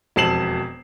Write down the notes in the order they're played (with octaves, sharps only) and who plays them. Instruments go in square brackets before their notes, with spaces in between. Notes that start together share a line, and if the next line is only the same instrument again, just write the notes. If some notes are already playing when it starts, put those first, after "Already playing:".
[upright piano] E1 F2 A5 C7 E7 F#7